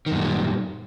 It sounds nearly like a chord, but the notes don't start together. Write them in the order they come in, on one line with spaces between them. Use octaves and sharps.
D#3 F#2 A#2 G3